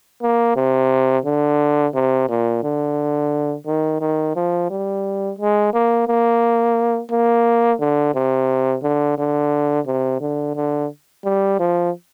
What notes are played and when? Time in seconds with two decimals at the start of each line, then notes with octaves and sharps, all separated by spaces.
0.22 A#3
0.56 C3
1.26 D3
1.94 C3
2.29 A#2
2.63 D3
3.67 D#3
4.01 D#3
4.36 F3
4.70 G3
5.39 G#3
5.74 A#3
6.08 A#3
7.11 A#3
7.80 D3
8.15 C3
8.83 D3
9.18 D3
9.87 C3
10.21 D3
10.56 D3
11.25 G3
11.60 F3